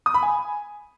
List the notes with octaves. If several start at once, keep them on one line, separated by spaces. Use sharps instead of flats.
D#6
B5
G#5